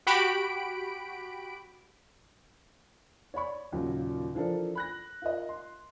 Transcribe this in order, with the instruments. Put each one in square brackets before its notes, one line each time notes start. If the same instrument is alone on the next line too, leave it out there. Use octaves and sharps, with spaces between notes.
[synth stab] F#4 G4 B5 D7
[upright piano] C#5 D5 B5 C#6
D#2 A#2 C#3 F#3
E3 F3 D4 A4 A#4
B5 F#6 A#6
F4 A#4 D#5
C6